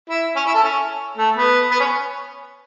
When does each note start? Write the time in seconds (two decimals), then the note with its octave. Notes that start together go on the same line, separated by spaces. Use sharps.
0.09 E4
0.36 C#4
0.45 E4
0.54 A4
0.64 C#4
1.17 A3
1.35 B3
1.71 B3
1.80 C#4